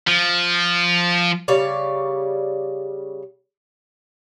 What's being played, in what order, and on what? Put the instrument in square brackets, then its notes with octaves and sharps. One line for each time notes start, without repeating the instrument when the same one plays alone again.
[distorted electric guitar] F3
[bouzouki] C#3 G3 C#5 D5